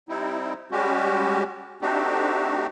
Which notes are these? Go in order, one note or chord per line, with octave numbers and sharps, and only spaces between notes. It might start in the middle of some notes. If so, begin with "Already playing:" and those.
G3 C4 D#4 E4
G3 G#3 C#4 F#4 G4
A3 C4 D4 D#4 F#4 G4